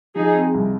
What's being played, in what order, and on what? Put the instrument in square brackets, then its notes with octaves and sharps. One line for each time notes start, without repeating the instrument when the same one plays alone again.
[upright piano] F3 [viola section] D#4 G#4
[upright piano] C4
C2